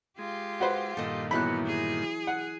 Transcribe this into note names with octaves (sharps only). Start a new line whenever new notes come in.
G#3 F4 G4
F#4 B4 C5
G2 A#2 D#3 A4 D#5
E3 F#3 B3 E4 B5 F#6
G#4
F#5